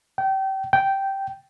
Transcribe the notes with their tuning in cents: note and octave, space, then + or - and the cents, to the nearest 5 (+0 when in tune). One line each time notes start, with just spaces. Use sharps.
G5 -30
G5 -10